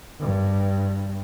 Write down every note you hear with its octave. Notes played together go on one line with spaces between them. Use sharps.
G2